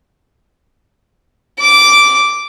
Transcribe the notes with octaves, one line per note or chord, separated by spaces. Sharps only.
D6